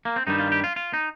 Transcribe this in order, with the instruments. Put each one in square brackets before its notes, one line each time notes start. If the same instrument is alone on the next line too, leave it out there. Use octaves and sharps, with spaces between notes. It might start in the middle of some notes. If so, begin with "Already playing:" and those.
[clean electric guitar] A#3
C4
G2 D#3 G3 D#4
F4
G4
F4
F4
D#4